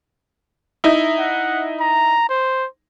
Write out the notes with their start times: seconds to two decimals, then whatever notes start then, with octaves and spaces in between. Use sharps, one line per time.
0.84 D#4 E4
1.19 F#5
1.81 A#5
2.29 C5